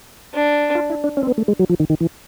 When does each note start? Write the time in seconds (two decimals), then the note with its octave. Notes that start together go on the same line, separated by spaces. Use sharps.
0.34 D4
0.75 F4
0.90 E4
1.04 D4
1.17 C#4
1.23 C4
1.27 B3
1.38 A3
1.48 G#3
1.59 F#3
1.70 F3
1.80 D#3
1.90 D#3
2.00 E3